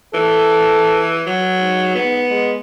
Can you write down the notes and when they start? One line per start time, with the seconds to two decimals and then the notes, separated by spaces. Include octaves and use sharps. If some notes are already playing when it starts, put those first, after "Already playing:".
0.14 E3 A4
1.27 F#3
1.58 G#2
1.95 B3
2.30 G#3